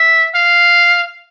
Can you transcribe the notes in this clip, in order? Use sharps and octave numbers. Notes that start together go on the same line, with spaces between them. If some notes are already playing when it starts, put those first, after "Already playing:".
Already playing: E5
F5